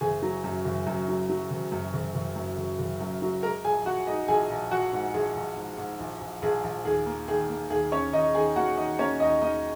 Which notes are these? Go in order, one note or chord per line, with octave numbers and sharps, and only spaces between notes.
F#1 G#4 G#5
F#3
F#2
F#1
F#2
F#3
F#3
F#1
F#2
F#1
F#1
F#2
F#1
F#1
F#2
F#3
G#3 A#4 A#5
A#1 G#4 G#5
A#1 F#4 F#5
G#3 D#4 D#5
A#1 G#4 G#5
A#1
A#1 F#4 F#5
G#2
A#1 G#4
A#1
G#2
G#2
A#1
A#1
A#1 G#4
A#1
D#2 G#4
A#3
D#3 G#4
A#3
D#2 G#4
D#2 C#4 C#5
D#2 D#4 D#5
D#3 G#4 G#5
A#3 F#4 F#5
D#3 D#4 D#5
A#3 C#4 C#5
D#2 D#4 D#5
A#3 D#4 D#5